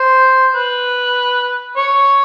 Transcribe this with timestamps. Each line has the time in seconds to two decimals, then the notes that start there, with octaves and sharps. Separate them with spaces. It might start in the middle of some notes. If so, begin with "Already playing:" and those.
Already playing: C5
0.54 B4
1.77 C#5